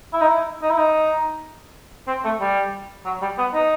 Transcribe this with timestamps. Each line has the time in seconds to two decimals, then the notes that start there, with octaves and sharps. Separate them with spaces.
0.13 E4
0.21 D#4
0.28 E4
0.62 D#4
0.70 E4
0.78 D#4
2.08 C4
2.25 A3
2.41 G3
3.05 F#3
3.22 G3
3.38 B3
3.54 D#4